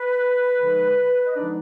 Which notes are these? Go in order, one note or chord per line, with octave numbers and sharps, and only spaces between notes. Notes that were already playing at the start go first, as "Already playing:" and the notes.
Already playing: B4
D3 F3 G#3 D#4
D#5
D3 F3 G#3 D4 D#4 D5